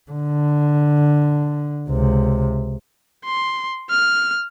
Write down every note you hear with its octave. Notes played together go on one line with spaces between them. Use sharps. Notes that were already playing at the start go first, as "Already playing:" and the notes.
D3
C#2 C3
C6
F6